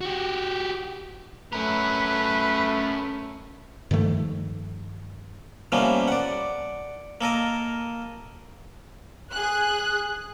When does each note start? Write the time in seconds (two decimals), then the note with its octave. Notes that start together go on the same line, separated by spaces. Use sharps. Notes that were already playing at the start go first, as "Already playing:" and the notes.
0.01 F#4 G4
1.53 A3 C#4 A#4 B4
3.91 G2 D#3 F3 A3
5.72 E3 F3 G3 A#3 B3 C#4
6.08 D5 F#5
7.21 A#3 A4 A#4 D#5
9.32 G#4 F#6